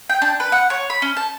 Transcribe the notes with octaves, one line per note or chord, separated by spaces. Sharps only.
G5
D4
B4
F#5
C#5
B5
C#4
A5